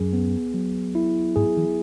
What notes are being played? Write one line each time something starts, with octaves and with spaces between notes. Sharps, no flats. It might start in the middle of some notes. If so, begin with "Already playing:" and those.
Already playing: F#2 G#4
B3
F#3
E4
G#2 G#4
E3